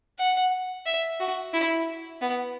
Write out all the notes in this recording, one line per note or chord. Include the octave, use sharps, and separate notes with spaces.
F#5
E5
F#4
E4
B3